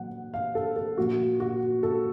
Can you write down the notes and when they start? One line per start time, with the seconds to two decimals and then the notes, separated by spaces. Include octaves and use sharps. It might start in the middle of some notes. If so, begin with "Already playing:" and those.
Already playing: A#2 F#3 F#5
0.34 F5
0.55 A4
0.76 A4
0.97 A#2 F3 F#4
1.40 F#4
1.83 A4